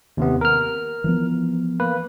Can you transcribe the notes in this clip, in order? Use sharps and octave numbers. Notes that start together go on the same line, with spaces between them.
D#2 C3 B3
A#4 F6
E3 F3 B3
A#3 B4